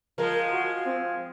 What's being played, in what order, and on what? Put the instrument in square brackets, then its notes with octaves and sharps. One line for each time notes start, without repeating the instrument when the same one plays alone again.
[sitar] F3 G#3 [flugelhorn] A#4
[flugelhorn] F#4
C4